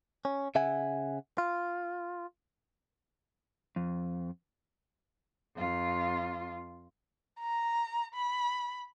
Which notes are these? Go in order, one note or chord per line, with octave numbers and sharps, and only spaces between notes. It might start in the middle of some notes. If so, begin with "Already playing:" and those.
C#4
C#3 E5 F#5 G#5
F4
F2
F2 F4
A#5
B5